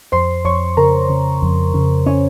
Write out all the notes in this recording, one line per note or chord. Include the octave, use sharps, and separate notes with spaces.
F2 C5 C6
F2 C#5 C#6
C#3 A#4 A#5
C#3
F2
C#3
C#4 C#5